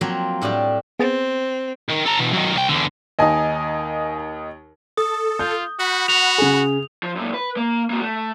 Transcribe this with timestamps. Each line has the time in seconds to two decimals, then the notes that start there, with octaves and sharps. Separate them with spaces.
0.01 F3 F#3 A#3 C4
0.42 A2 G3 D4 G4
0.99 B3 C4 G#4 A6
1.90 D#3
2.06 A4 A#5
2.20 B2 E3
2.33 F#2 D#3
2.55 C2 G5
2.69 E2 D3
3.19 D#2 D#4 D#5 G#5 A5
4.97 A4 D#6
5.39 F4 G6
5.79 F#4 F#5 B5
6.08 F#4 F7
6.38 C#3 G#4
7.03 F3
7.16 F#2 A#2
7.34 B4
7.57 A#3
7.90 A#3 F#4
8.02 A3